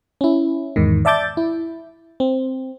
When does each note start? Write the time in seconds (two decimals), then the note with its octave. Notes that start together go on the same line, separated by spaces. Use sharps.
0.21 C#4 E4
0.76 E2 G#2 D#3
1.05 D5 E5 A5 D6 G6 A6
1.37 E4
2.20 C4